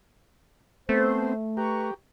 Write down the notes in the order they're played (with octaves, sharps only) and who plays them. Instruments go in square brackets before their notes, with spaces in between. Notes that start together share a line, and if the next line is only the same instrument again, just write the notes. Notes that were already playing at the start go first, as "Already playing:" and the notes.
[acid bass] A3 [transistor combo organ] B3 C4 [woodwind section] C5
[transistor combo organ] G4 [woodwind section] B4 A#5 C#6